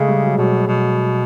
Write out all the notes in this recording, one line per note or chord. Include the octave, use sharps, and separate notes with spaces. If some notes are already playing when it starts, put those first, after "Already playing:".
Already playing: C#3 G#3 A3
G3
F#3
B2 F#3
B2